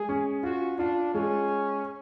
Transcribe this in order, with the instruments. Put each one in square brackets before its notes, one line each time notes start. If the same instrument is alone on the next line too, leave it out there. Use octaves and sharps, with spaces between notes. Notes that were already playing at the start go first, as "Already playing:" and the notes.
Already playing: [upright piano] G#3 [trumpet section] G#4
[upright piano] C#4
[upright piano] F4 [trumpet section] F#4
[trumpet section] D4 [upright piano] F4
[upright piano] G#3 [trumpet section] C#4